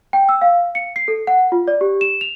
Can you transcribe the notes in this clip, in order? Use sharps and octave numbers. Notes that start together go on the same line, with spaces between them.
G5
E6
F5
C#7
C7
A4
F#5
F4
D5
G4
E7
F7